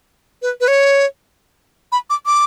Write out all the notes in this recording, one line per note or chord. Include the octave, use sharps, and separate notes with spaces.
B4
B4
C#5
B5
D6
D6